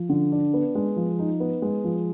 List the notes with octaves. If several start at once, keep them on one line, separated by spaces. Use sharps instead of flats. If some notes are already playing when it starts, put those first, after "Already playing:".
Already playing: F3
D3
D4
B3
G#3
F3
D#4
B3
G#3
F3